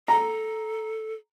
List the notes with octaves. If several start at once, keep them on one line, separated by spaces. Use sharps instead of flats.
A4 A#5